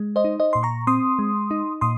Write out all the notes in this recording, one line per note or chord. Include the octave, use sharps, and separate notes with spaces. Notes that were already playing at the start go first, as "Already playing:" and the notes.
Already playing: G#3
C5 D#5
D#4
C5 D#5
A#2 C6
A#5 C#6
C4 C6 D#6
G#3
D#4
A#2 C6 D#6